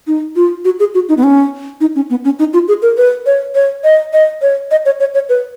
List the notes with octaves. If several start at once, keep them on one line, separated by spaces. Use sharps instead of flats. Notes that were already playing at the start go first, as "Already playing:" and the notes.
D#4
F4
F#4
G#4
F#4
D#4
B3
C#4
D#4
C#4
B3
C#4
D#4
F4
G#4
A#4
B4
C#5
C#5
D#5
D#5
C#5
D#5
C#5
C#5
C#5
B4